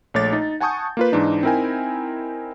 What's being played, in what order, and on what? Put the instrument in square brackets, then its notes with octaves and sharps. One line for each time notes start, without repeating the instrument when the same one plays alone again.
[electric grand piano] A#1 A3 C#5 D6 A6
D#4
F#5 G#5 A5 C#6 D#6 G6
A#3 F4 B4
G#2 E3 D4 D#4
C4 D#4 E4 A#4 G5 G#5